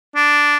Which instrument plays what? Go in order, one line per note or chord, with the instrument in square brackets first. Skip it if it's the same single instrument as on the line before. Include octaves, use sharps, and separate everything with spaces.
[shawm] D4